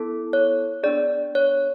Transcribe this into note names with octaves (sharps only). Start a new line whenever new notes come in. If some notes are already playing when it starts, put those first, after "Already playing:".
Already playing: B3 E4 A4
C#5
B3 D4 G#4 D5
C#5